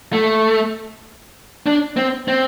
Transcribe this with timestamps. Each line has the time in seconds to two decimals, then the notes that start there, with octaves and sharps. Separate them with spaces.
0.13 A3
1.66 D4
1.97 C4
2.28 C4